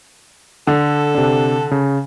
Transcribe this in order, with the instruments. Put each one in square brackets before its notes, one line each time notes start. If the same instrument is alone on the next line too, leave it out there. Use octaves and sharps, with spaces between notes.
[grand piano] D3 [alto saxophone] A4
[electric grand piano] C3 D4
C#3